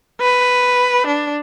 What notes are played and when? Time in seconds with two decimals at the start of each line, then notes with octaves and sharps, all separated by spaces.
0.20 B4
1.06 D4